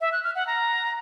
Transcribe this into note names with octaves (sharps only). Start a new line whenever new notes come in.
E5
F#6
F6
F#5
A#5